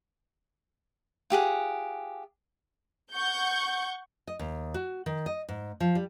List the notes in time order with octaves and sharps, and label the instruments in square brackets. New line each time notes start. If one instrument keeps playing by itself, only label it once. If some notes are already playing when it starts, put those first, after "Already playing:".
[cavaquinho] F4 G4 G#4 F#5
[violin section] F#5 C#6 G6
[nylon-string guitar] D#5
D#2
F#4
D#3
D#5
G#2
F3
G3